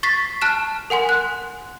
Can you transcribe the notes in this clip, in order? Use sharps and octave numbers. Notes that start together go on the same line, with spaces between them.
C#6 A6 B6 C7
A5 F6 F#6 E7
A#4 F#5 G#5 C6
F#6